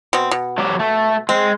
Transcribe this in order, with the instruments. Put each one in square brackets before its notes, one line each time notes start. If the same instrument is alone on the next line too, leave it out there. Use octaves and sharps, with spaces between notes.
[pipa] B2 C4
B2
[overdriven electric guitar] F#3 G4
A3
[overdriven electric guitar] G#3 [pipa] C4